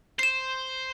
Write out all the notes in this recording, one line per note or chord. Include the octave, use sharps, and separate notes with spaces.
C5 C7 E7